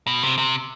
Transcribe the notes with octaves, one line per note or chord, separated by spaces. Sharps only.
B2
C3
C3